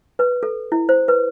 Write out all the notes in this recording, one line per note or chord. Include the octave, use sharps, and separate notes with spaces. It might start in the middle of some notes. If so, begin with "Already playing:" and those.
B4
A4
E4
C5
B4